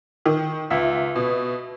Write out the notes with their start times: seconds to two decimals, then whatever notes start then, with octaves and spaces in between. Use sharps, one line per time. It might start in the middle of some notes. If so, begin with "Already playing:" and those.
0.26 D#3
0.70 C#2 E5
1.15 B2